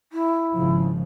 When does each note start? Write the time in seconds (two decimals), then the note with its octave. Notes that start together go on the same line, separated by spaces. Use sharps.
0.12 E4
0.53 G#1 C#3 F3